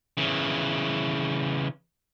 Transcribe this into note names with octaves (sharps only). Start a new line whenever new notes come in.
C#3 E3